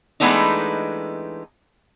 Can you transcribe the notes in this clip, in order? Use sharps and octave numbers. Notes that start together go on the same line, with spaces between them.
E3 G#3 A3 B3 D4 D#4